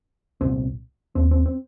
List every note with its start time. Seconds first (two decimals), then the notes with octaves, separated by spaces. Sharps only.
0.41 C2 A#2 C4
1.15 D#2 C4
1.31 C4
1.46 C4